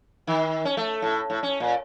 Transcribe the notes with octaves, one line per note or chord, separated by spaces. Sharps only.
D#3
C#4
A3
A2
A2
C#4
A#2